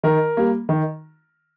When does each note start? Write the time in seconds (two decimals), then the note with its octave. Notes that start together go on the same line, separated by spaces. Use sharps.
0.03 D#3 A#4
0.37 G3 A#3
0.69 D#3